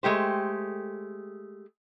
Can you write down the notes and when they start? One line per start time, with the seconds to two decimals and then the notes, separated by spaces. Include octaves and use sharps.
0.03 G#3 A3 G4 C5